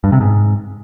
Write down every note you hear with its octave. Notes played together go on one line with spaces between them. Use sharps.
G2
C3
G#2